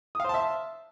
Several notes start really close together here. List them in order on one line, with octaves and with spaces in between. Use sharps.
D#6 F5 C5 A5 E5